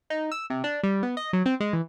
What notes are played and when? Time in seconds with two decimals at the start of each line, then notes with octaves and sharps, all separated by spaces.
0.10 D#4
0.32 E6
0.50 C3
0.64 D4
0.83 G3
1.03 B3
1.17 D#5
1.33 F#3
1.46 C4
1.60 G#3
1.73 E3